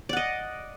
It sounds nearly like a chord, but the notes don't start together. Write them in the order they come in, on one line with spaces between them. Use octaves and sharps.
D5 F#5 D#5